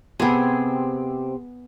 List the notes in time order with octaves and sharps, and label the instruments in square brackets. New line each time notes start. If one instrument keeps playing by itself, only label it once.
[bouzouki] C3 C4 [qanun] B3 G#4